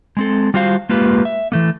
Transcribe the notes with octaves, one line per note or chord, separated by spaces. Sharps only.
G#3 C4 A4
G3 F4 F#4 C5 F5
G#3 A#3 F4 G4 B4
E5
E3 A3 A#3